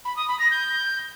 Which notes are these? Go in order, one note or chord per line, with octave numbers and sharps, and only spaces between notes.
B5
D#6
B5
A#6
G6